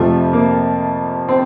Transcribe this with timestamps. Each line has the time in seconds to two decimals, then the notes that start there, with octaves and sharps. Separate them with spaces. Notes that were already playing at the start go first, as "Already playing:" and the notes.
Already playing: F2 C3 F3 A3
0.33 A#3
1.29 C4